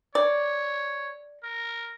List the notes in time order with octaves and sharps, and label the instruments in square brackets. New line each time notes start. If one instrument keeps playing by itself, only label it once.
[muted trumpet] C#5 [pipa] D5
[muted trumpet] A#4